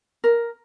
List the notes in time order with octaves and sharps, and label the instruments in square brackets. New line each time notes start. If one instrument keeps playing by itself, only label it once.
[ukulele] A#4